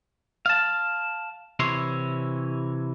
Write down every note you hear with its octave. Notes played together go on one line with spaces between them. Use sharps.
F5 A5
C3 E3 E4 C#5 C6